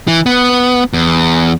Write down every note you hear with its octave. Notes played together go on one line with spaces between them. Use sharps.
E3
B3
E2